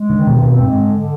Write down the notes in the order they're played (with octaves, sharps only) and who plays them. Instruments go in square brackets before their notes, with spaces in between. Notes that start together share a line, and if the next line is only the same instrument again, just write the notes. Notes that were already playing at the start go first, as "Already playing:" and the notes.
Already playing: [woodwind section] G#3
[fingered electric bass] D3 [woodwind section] D#3
[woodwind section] G2 [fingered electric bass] B2
[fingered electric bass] B2 [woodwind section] C4
[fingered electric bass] G#2 [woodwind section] G#3
[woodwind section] D3
D3